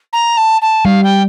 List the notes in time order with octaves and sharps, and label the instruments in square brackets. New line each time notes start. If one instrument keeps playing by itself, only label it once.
[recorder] A#5
A5
A5
[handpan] G3 [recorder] F5
[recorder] G5